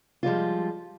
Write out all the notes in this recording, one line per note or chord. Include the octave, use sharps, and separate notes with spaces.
F3 G3 G#3 F4